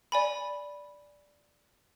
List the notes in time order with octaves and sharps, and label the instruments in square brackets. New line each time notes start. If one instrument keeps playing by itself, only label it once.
[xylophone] D5 G#5 B5